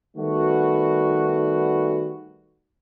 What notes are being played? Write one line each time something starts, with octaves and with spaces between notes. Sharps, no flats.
D#3 G3 A3 B3 F#4